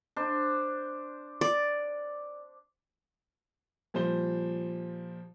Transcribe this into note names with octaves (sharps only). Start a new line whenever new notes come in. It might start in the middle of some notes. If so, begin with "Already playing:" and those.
D4 C5
D5
A#2 F3 G3 C5 G7